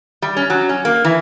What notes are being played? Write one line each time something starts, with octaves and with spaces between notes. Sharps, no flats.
G3
C#4
F#3
C#4
A#3
E3